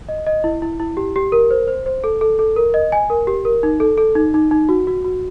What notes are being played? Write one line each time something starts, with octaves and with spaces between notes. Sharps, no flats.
D#5
D#5
E4
E4
E4
G4
G4
A#4
C5
C5
C5
A4
A4
A4
A#4
D#5
G#5
A#4
G4
A#4
D#4
A4
A4
D#4
D#4
D#4
F#4
F#4
F#4